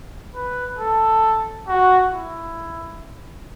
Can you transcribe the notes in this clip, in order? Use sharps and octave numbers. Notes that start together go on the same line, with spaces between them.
B4
A4
F#4
E4